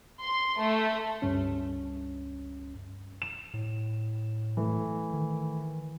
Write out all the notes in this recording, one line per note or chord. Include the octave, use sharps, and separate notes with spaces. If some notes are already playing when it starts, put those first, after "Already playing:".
C6
A3
C#2 G2 C#4
E7
A2
E3 A3
D#3